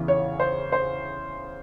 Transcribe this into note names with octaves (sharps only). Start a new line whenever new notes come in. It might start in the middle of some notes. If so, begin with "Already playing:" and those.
Already playing: E2 C#3 E3
C#5
C5
C5